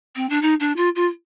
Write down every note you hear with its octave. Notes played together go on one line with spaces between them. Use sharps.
C4
D4
D#4
D4
F4
F4